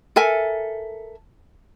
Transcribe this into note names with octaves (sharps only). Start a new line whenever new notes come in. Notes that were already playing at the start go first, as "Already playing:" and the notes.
A4 A#4 E5 G#5